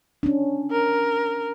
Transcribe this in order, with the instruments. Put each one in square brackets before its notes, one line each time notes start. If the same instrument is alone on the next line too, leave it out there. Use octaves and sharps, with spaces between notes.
[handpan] C#4 D4
[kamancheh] A#4